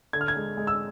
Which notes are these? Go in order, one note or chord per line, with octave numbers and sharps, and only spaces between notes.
D3 G#6
F6
G#6
G#3
G#3
E6